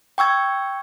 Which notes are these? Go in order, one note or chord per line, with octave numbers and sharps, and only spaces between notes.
G5 C#6 E6 G#6